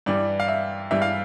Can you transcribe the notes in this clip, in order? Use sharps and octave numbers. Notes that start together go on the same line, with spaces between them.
G2 E3 G3 D5
F5
E5
G2 E3 G3 E5
F5